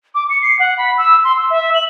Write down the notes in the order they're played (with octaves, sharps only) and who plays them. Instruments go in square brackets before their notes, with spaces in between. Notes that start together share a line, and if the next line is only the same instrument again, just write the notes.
[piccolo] D6
C#7
C7
F#5
B5
E6
C6
E6
E5
F#7